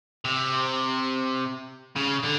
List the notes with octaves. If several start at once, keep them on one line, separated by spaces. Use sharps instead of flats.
C3
C#3
D3